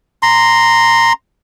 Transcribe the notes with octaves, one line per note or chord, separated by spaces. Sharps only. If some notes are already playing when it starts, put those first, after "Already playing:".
A#5 C6